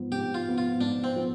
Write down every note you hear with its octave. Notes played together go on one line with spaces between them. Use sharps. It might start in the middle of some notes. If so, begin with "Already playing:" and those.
Already playing: G#2 F3 B3
G#2 G4
F4
F3 B3
F4
G#2 D4
C4
F3 B3